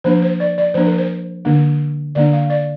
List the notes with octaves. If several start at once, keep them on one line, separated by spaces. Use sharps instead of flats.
F3 A#3 D4 C5
C5
D5
D5
F3 A#3 D4 C5
A#4
C5
D3 A#3 D4
D3 A#3 D4 D5
F5
D5